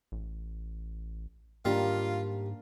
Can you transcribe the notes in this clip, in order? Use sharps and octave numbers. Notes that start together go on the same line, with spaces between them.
A1
G#2 D#3 G3 A#3 D4 F4 A#4